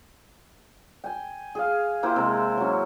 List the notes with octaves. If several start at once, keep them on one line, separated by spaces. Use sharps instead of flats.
G5 G#5
G#4 F5
A#3 E4 G4 C5
C3 G#3
F#3 C#4